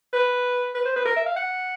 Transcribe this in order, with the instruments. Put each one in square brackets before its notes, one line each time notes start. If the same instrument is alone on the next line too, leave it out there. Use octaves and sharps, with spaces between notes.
[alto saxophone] B4
B4
C5
B4
A#4
E5
F5
F#5